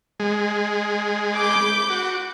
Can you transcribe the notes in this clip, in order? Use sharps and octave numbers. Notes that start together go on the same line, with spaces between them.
G#3
B5 D6 G6
F#4